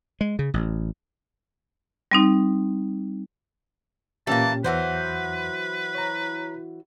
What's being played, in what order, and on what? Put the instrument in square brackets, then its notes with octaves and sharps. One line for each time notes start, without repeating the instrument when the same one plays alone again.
[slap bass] G#3
C#3
A1
[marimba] G3 C4 D#4
[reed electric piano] A#2 C#4 G4 [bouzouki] E3 A#3 [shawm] A5
[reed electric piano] E2 [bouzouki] E3 F#3 C5 [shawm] B4
[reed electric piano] C#5 A#5